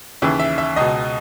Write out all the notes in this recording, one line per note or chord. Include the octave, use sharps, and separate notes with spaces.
D#2 C#3 E3 E5
E5
E5
C#2 B2 D#5